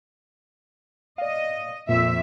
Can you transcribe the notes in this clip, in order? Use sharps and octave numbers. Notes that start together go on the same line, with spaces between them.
D5 D#5 F5
F2 A#2 E5